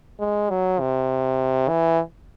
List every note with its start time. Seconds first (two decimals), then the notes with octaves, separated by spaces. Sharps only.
0.20 G#3
0.50 F#3
0.80 C3
1.68 E3